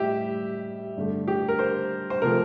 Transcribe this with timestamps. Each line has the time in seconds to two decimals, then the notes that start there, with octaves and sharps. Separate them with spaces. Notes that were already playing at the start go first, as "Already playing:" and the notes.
Already playing: A2 G3 G4 E5
0.96 G2 D3 A3
1.28 G4
1.48 A#4
1.59 C5
2.10 C5
2.22 C3 F3 A3 A#4